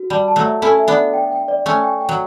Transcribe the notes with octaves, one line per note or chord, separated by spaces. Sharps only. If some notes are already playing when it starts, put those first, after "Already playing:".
Already playing: F#4
G3 A5
A5
F#3 A3
E5
C#4 E4 A4
E5
B3 D4
E5
G5
G5
D5
A3 C#4 C#6
G5
G5
F#3